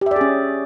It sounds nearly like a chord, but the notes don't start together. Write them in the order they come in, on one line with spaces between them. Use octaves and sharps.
G4 E5 D5 G#4 C#4